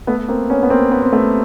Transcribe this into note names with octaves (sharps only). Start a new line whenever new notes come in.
A3 B3
A#3 C4
B3 C#4
B3
A#3 C4
B3
C4
A3 B3